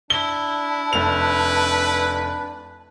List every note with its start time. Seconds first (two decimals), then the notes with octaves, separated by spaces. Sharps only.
0.10 D4 E4 G7
0.93 F1 B4 F7